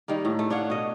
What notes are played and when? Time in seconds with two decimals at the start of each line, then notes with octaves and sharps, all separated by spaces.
0.08 D#3 G3 A#3
0.25 A2
0.39 A3
0.50 D4 C#5 F5 F#5
0.70 B2 D#5